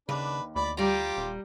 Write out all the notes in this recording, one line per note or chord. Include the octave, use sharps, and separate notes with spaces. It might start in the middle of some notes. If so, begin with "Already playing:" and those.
D#2 C#3 D4 B4
D2 D5 B5
G3 F4 G4 A#5
D#1